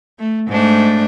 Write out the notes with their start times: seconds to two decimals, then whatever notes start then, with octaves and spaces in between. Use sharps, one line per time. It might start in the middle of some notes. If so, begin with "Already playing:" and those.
0.19 A3
0.48 G#2 A3 D4